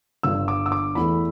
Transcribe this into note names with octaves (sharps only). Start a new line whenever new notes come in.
G1 G2 D3 E6
D6
E6
D6
E2 E3 A3 B5